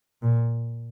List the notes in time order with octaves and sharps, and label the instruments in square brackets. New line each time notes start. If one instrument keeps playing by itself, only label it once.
[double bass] A#2